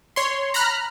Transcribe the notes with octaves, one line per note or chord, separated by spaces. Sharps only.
C#5 C6
A#5 B5 F6 F#6